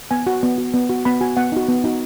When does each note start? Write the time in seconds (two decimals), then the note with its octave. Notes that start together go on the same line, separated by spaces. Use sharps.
0.11 B3 G#5
0.27 F#4
0.43 B3
0.58 F#4
0.74 B3
0.90 F#4
1.05 B3 B5
1.21 F#4 G#5
1.37 B3 F#5
1.52 D#4 F#4
1.68 B3
1.84 D#4 F#4